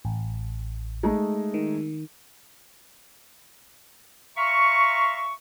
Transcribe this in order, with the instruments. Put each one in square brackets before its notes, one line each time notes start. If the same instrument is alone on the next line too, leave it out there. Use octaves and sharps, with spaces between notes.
[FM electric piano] A1
[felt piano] G#3 A3 D#4
[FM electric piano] D#3
[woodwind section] E5 F5 A#5 C6 C#6